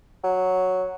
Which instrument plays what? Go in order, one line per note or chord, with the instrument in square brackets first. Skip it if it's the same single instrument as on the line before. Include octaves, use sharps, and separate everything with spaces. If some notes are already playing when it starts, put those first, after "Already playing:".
[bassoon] F#3